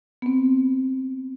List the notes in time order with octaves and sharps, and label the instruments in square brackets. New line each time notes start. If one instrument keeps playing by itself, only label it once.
[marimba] B3 C4